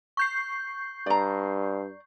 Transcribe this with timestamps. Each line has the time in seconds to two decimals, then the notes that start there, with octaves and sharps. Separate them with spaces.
0.17 C#6 G6 C7
1.06 G2 D5 A#5